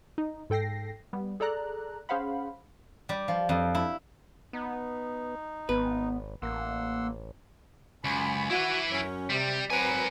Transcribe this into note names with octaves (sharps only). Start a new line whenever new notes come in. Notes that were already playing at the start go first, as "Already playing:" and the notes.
D#4
G#2 A4 G5 A#6 C7
G3 B3
G#4 A4 D5 A#5 F#6
C#4 G#4 C5 F5 F#5 B5
G3
F3
F2
E4
B3 D#4
G#1 B3 B4
A1 A#3 F#5 C6 E6
C#2 F#2 G#5 B5
E4 F#4 B4
F#2 C#4
C3 G3
F#3 C4 A#4 B4 G#5